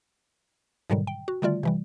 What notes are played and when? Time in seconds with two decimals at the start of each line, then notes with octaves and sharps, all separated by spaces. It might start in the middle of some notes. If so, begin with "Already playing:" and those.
0.90 G#2 B2 D3 D#3 F#3 G3
1.07 G5
1.28 F#4
1.42 D3 D#3 G3 A3 F4 D5
1.63 C3 E3 G3